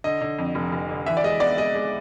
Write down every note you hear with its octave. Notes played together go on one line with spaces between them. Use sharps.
D3 D#5
D3
F2
F1
F1
D3
E3 E5
D5
G#3 D#5
B3 D5
G#3 D#5
G#3